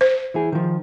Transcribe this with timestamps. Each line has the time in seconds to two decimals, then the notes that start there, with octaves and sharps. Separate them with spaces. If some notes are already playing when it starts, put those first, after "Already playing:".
0.01 C5
0.34 E3 E4 G#4
0.52 D#3 F3